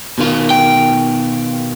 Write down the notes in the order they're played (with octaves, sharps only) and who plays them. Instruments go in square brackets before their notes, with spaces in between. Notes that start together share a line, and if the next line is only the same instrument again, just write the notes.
[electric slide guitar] B2 D#3 F4
[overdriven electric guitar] G5